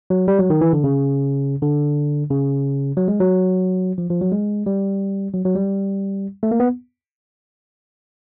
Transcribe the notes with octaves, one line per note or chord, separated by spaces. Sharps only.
F#3
G3
F#3
D#3
E3
D3
C#3
D3
C#3
F#3
G#3
F#3
F3
F3
F#3
G#3
G3
F#3
F#3
G3
A3
A#3
B3